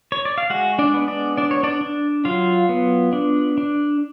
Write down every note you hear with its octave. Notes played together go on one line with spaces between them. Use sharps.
C#5
D5
F5
G#3 F#4 F#5
D4 D5
B3
D4 D5
D4 D5
C#5
D4 D5
D4
F#3 F4 F5
B3
D4
D4